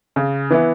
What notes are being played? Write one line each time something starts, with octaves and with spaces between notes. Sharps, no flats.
C#3
E3 B3 E4